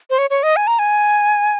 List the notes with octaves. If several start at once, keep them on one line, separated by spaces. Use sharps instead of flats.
C5
C#5
C#5
D#5
G#5
A#5
G#5